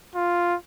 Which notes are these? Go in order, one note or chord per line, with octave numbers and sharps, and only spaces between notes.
F4